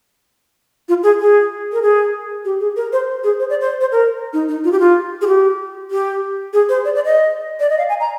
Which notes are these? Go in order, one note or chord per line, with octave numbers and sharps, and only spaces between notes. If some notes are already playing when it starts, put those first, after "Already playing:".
F4
G#4
G#4
A#4
G#4
G4
G#4
A#4
C5
G#4
C5
D5
C5
C5
A#4
D#4
D#4
F4
G4
F4
G#4
G4
G4
G#4
C5
D5
D5
D#5
D5
D#5
F5
G#5
A#5